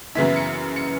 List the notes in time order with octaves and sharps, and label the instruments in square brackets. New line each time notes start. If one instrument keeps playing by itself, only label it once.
[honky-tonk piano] F#2 C#3 E3 B3 E4 B6
C#7
C#7